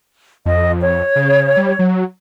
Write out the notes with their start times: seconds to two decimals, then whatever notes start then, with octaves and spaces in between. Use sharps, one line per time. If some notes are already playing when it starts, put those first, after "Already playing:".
0.46 F2 D#5
0.80 C#5
1.16 C#3
1.57 G3
1.79 F#3